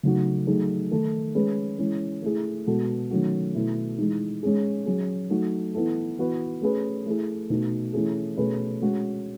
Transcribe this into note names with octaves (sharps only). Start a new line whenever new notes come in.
C#3 F#3 A3 D#4 F#4
F#3 A3 D#4 G#4
D#3 A3 D#4 A4
G#3 C#4 G#4 B4
E3 G#3 C#4
A3 E4 G#4
B2 G#3 B3 F#4 A4
D#3 F#3 A3 C#4 F#4
B2 A3 E4
E3 G#3 D#4
G#3 C#4 G#4
F#3 C#4 G#4
F#3 A3 D#4 F#4
E3 B3 E4 A4
E3 B3 F#4 B4
A3 C#4 G#4 B4
A3 E4 G#4
B2 A3 D#4
E3 A3 C#4 E4 G#4
B2 A3 C#4 G#4 B4
G#3 C#4 F#4